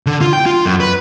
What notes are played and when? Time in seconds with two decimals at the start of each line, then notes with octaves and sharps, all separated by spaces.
0.06 D3
0.21 F4
0.33 G5
0.46 F4
0.66 F#2
0.80 B4